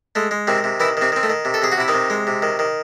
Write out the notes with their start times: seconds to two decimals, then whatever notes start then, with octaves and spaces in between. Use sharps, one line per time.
0.15 G#3 A3
0.31 G#3
0.47 C3 D#3 C4
0.64 C3
0.80 D#3 E3 E4
0.97 C3 D#3 C4
1.12 D#3 C4
1.23 A3
1.30 D#3
1.45 C3
1.54 A4
1.62 C3 G#4
1.72 F#4
1.77 C3 E4
1.88 D#3 D#4
1.94 C3
2.10 G#3
2.27 C3
2.42 D#3
2.59 D#3